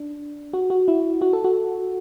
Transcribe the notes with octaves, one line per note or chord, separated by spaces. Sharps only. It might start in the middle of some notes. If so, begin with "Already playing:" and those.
Already playing: D4
F#4
F#4
E4
F#4
A4
F#4